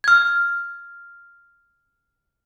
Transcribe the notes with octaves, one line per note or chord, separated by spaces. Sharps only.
F6 G#6